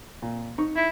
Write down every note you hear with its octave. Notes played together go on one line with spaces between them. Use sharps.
A#2
D#4 C#6
E4